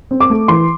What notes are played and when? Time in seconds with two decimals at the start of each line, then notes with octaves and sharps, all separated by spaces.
0.11 C4
0.20 D6
0.30 A3
0.48 E3 C6